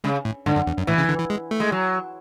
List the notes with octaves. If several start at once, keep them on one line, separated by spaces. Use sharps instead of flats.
C#3 G#3
A2
G#2 D3
F#2
E2
F#2
A2 E3
C#3
D3
E3
G#3
A3
G#3
F#3